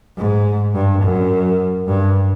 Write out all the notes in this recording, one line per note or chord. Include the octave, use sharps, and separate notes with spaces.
G#2
G2
F#2
G2